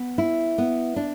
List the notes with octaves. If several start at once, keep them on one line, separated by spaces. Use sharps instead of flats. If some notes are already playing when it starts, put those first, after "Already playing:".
Already playing: B3
E4
B3
D4